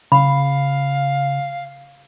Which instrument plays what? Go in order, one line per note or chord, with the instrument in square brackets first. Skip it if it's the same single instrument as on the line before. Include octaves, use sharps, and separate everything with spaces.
[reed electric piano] C#3 [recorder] F5 [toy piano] B5